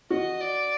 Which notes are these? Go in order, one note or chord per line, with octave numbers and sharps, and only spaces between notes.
F#4 D#5
D5